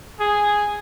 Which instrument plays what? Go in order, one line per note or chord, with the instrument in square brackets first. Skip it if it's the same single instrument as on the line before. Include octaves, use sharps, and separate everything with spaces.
[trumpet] G#4